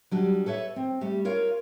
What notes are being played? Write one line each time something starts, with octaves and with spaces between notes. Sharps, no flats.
F#3 G3 D4
A4 B4 C#5 E5
C4
G3 A3
F4 A#4 C#5 F5